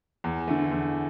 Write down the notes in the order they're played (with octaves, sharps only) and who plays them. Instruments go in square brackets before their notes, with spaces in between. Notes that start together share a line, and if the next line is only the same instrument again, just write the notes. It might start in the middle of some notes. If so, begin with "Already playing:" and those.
[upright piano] E2
D3 A3
E2